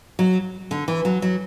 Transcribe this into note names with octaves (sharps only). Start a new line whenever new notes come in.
F#3
D3
E3
F#3
F#3